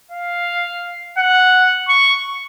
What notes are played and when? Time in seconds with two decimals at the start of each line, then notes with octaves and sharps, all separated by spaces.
0.11 F5
1.18 F#5
1.88 C#6